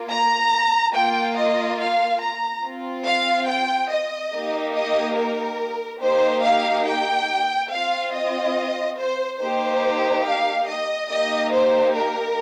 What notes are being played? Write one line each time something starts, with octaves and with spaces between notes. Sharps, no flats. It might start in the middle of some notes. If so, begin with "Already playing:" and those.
Already playing: A#3 F4
A#5
A#3 F4 G5
D#5
F5
A#5
C4 F4
F5
G5
D#5
A#3 D#4 G4
D#5
A#4
A#3 D#4 G4 C5
F5
G5
C4 F4 F5
D#5
C5
A#3 D#4 G4 C5
F5
D#5
A#3 D#4 G4 D#5
C5
A#4